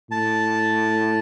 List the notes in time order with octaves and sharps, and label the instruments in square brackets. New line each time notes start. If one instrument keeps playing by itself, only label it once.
[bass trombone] A2 [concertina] A5